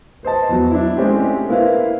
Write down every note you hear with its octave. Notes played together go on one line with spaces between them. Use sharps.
B4 C5 D#5 A5
E2 F#3
D4 E4
G#3 A3 C4 C#4 G4 C5
A#3 E4 B4 C5 F5